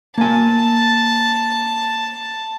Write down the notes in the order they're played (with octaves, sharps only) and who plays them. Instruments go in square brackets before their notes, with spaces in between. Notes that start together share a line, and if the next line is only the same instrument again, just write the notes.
[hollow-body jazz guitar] A#3 G#5 [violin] A5